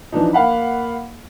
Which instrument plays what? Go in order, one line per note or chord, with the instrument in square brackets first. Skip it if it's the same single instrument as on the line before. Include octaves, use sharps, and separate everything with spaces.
[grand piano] E3 F3 D4 D#4
A#3 F5 F#5 B5